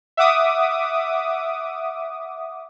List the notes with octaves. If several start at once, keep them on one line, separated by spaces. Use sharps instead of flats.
E5 F#5 D6 D#6